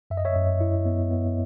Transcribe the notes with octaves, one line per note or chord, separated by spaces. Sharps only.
F#2 E5
D#5
C#5 E5
F#2
E4
B3
B3